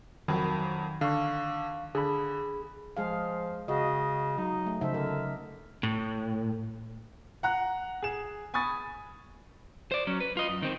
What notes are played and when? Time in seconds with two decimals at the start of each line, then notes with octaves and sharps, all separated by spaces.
0.28 F2 D#3 F#3 B5
1.01 D3 F5 C#6
1.95 D3 G#4 B5
2.97 F3 G#3 G#4 F5
3.68 C#3 F#4 D#5
4.38 F#3 D#4
4.67 A3
4.81 C#3 F3 D#4 E5
4.94 D3 A#4
5.83 A2
7.43 F#5 A#5 F#6
8.02 G#4 E7
8.54 G#5 B5 C#6 D#6 A6
9.91 C5 D5
10.07 F#3 C#4
10.20 B4
10.37 F4 D#5
10.49 F#2
10.63 D#3 C4